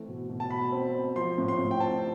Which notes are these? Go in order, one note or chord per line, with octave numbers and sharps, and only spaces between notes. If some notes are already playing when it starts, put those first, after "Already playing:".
Already playing: E3 A3 C4
B2
B2
A5
B2 B5
C4
C4
F3 C6
A2
C6
A2
G5
C4 A5